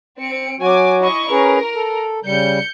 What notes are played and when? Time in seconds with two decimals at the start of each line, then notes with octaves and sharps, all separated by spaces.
0.18 C4 C#7 D7
0.60 F#3 F#4 G#5 D6
1.00 E4 D#5 C#6
1.30 C#4 G#4 A#4 B4
1.75 A4
2.24 C#3 G3 G6 C#7